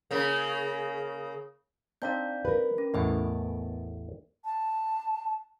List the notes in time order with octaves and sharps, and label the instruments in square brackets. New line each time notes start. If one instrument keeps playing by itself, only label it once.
[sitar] C#3 A#3
[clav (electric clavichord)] C4 D4 D#4 [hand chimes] D5 F5 G6
[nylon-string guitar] A#4 B4
[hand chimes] C#4
[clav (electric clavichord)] A1 E2 A2 [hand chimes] B3 D#5 G#5
[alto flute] A5